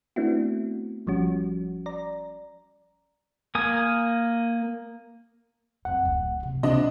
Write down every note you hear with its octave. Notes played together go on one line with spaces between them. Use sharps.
A3 B3 C4 D4 E4 F#4
G#1 F3 G3 C#4 F#4
D5 A#5
A#3 G#5 D#6
F2 G3 F#5
D1
C3
D2 C3 D4 D#5